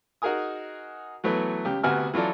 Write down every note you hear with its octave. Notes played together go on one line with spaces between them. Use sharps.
D#4 F#4 G#4 A#4 G#5 D#6
E3 F#3 A3 B3
C#2 G4
D2 C3 B3 F#4 G#5 F6
E3 F#3 F4 A4 D5